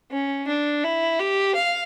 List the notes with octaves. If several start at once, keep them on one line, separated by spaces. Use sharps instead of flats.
C#4
D4
E4
G4
F5